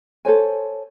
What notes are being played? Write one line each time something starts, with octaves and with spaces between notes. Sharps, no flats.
A4 C5 C#5 G#5